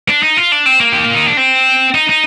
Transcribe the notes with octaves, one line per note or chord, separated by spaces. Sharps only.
D4
D#4
F4
D4
C4
A#3
G4
F4
D#4
D4
C4
D#4
D#4